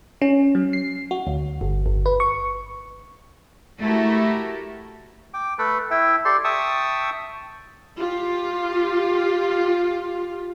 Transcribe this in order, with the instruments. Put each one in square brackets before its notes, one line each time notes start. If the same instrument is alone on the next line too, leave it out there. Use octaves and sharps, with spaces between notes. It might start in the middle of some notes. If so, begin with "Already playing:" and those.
[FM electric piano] C#4
F#3
C7
F#4
D2
G1
G1
B4
C#6
[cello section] A3 E4 F#4 G4 A4 A#4
[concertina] G5 D6
A3 A4 B4
E4 E5 G5
G4 A4 D5 C6
E5 G5 A5 C#6 D#6 E6
[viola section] F4 G4